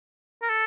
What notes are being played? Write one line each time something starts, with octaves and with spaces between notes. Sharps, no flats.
A#4
A4